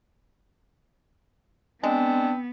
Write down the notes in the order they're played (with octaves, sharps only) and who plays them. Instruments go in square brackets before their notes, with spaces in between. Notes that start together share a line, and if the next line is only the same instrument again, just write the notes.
[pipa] G#3 [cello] B3 [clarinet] C4 [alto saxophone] D4